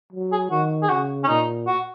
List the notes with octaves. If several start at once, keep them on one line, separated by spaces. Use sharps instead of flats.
F#3
G#4
D#3 F#4
G#4
C#3 F#4
C#4
A#2 D#4
F#4